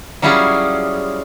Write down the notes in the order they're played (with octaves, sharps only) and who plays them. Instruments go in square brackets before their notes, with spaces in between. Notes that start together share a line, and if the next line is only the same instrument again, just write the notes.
[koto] F#3 G3 C#4 E4 F4 G#4